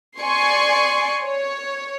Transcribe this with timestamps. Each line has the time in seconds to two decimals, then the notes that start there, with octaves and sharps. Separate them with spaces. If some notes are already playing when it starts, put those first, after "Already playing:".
0.20 D5 G#5 C6 C#6
1.24 C#5